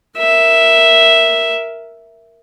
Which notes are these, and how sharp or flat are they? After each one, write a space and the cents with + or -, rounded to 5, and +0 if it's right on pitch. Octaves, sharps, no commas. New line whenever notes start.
A#4 +0 E5 +0